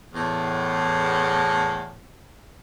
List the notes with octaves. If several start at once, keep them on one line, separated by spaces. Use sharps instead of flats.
E2 A2